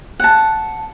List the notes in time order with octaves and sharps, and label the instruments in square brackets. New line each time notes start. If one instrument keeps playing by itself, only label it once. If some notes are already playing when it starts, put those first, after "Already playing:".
[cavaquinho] F#5 A5